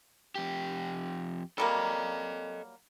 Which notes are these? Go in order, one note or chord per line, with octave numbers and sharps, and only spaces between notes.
F2 G4
F#3 G3 A#3 A4 D#5